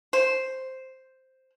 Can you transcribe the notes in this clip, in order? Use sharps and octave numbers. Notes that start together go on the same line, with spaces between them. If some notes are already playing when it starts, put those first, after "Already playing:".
C5